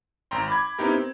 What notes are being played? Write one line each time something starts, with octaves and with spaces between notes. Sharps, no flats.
G#1 G5 A#5 C6
B5 D6 G#6
B3 C4 D#4 E4 G4 A#4
C4